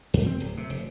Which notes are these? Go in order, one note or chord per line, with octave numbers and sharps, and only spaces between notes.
D#2
C4
D1
C3
F1